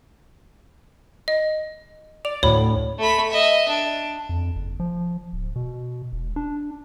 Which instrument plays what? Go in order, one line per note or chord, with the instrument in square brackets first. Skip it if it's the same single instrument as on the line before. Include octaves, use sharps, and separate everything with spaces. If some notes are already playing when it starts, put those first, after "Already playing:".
[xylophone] D#5
[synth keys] D5 [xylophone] F7
[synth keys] D2 A2 [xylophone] C#5 B5
[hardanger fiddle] A3 B5
D#5 E5
D4
[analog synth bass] F2
F#1
F3
D1
B2
E1
D4